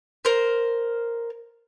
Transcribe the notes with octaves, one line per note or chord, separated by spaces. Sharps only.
A#4 C5